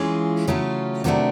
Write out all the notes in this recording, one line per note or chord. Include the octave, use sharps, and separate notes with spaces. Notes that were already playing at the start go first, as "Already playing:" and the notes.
Already playing: E3 G#3 C#4 F4 G#4
C#3 F#3 A3 C#4 F4
C3 D#3 F#3 A3 D4